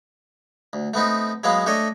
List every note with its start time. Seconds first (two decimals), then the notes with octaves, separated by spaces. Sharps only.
0.73 D2
0.94 A3 B3 C4 D#4
1.44 F#3 G#3 A#3 B3 F5
1.66 A3 D4 A4 C#5 D#5